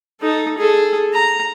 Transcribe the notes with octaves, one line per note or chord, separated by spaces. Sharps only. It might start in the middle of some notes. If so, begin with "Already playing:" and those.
D#4 A4
G#4 A4
A#5